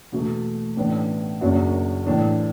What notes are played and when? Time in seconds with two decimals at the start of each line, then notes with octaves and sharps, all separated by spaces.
0.12 E2 B2 A3
0.77 A1 A2 E3 B3 D4
1.41 F#1 F#2 F#3 D4 F#4
2.07 A2 E3 D4